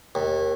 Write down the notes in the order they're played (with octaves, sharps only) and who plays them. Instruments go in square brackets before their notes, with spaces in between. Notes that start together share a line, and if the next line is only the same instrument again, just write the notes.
[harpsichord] D#2